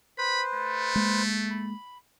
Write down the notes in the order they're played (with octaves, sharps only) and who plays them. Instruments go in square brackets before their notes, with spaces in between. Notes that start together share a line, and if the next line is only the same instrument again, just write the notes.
[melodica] B4 C5 [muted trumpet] B5
[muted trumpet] A3
[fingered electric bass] G#3 A#3
[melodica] B5